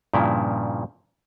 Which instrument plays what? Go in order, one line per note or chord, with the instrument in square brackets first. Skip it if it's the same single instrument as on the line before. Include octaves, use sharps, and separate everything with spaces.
[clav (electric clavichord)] G2 A#2 C#3 F3 E4